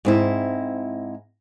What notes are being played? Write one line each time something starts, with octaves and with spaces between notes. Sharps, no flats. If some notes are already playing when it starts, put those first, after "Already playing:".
G#2 C4 E4